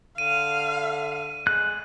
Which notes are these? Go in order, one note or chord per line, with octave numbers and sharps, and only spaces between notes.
D3 F5 D#7
G#3 F#6